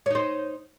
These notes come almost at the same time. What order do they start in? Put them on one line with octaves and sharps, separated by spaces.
C#5 D#4 C5